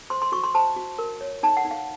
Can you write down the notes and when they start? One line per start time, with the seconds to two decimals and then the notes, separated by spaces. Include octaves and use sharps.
0.10 C5 C6
0.22 C6
0.32 F#4 C#6
0.44 C6
0.54 C5 A5
0.76 F#4
0.99 A#4
1.21 C#5
1.43 D#4 A5
1.57 F#5
1.65 D#4
1.71 F5